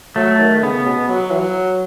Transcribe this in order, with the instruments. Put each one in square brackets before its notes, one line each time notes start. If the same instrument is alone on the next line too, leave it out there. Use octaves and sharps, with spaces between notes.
[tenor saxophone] F#3 [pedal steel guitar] A3
[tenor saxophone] D#3
[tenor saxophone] C#3 [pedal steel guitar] B3
[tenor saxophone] B2
F#3
E3
F#3